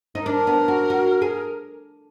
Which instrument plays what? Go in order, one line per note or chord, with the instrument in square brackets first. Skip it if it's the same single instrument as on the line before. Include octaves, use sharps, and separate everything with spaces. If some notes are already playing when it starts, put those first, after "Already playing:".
[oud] D#4
[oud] D4 [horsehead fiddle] A#4
[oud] B3
F#4
F#4
G#4